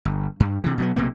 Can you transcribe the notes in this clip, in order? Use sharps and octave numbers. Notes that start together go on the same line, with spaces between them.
G1
G2
C3 E3
B2 F#3 B3
B1 C3 A#3 B3